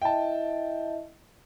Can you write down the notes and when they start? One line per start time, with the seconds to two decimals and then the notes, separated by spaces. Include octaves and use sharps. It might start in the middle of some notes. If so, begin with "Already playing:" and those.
0.02 E4 D#5 E5 G5 A5